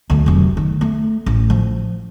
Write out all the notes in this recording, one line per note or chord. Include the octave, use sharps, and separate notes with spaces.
D2 A3
F1 F#2
D#3
A3
A1
F3